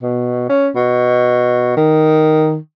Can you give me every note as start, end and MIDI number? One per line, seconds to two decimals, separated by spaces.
0.02 0.49 47
0.49 0.69 61
0.76 1.76 47
1.77 2.57 51